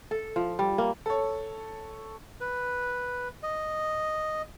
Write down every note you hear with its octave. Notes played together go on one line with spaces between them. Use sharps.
A4
F3
G3
A#3
A4 C#5
B4
D#5